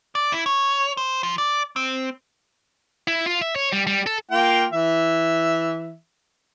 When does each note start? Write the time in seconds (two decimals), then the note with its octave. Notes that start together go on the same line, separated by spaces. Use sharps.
0.15 D5
0.32 E4
0.46 C#5
0.97 C5
1.23 F3
1.38 D5
1.76 C4
3.08 E4
3.26 F4
3.42 E5
3.56 C#5
3.72 G3
3.87 G3
4.07 A4
4.31 A#3 F4 G5
4.72 E3 E5